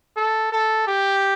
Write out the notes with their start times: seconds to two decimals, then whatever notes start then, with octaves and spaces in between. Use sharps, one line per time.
0.16 A4
0.52 A4
0.87 G4